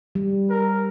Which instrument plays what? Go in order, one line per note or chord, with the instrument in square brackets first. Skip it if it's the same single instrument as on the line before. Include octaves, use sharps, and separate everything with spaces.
[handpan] G3
[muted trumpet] A#4